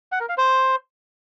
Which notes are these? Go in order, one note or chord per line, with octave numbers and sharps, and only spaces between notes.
F#5
A#4
F5
C5